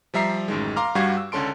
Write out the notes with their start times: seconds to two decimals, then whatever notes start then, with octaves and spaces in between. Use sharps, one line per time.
0.14 F3 G3 E5 A#5 C7
0.48 A1 F#2 D#3 G#3
0.76 F5 A#5 C6 D6 F6
0.95 G2 G3 F#4 F5 C#6 G#6
1.17 E6
1.32 C#2 D3 C#4 A4 C6 D7